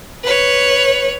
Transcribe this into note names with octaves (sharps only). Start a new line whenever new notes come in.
B4 C#5